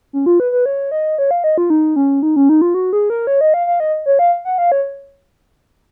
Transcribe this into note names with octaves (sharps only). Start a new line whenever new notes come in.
C#4
F4
B4
B4
C#5
D#5
C#5
F5
D#5
F4
D#4
C#4
D#4
C#4
D#4
F4
F#4
G#4
A#4
C#5
D#5
F5
F5
D#5
C#5
F5
F#5
F5
C#5